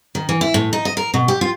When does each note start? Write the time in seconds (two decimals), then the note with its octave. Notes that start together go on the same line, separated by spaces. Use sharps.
0.15 D#3
0.29 E3
0.41 E4
0.54 A2
0.73 D#4
0.85 D#5
0.97 A#4
1.14 B2
1.28 G4
1.41 F4